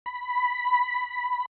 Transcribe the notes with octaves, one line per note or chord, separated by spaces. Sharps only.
B5